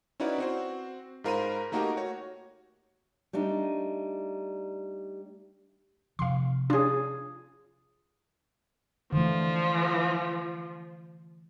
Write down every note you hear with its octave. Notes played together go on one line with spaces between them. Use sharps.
C#4 D#4 E4 F#4 B4 D5
C4 F#4 C5
G#2 F4 A#4 C5 B5 D#7
A3 A#3 D#4 F#4 G4 A#4
F#4 C#5
G3 A3 D4 D#4
C3 F3 F5 C6
C#4 D4 F4 G#4
D3 E3 F3 A3